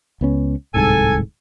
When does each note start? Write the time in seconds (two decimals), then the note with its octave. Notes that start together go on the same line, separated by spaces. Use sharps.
0.21 C#2 B3 C#4
0.74 D1 C2 G#2 A4 G#5